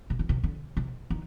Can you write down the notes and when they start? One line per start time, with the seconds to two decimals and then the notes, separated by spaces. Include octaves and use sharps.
0.10 C3
0.19 D3
0.29 C3
0.43 D3
0.77 C3
1.10 D#3